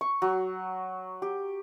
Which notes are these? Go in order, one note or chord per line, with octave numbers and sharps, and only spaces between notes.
C#6
F#3
G4